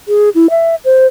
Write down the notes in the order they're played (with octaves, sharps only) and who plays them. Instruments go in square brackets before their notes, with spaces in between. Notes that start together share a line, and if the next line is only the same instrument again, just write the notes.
[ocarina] G#4
E4
E5
C5